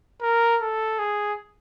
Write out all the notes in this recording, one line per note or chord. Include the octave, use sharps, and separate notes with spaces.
A#4
A4
G#4